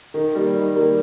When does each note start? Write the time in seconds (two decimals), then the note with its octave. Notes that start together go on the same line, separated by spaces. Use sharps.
0.14 D#3
0.35 G3 A#3
0.55 D#3
0.76 G3 A#3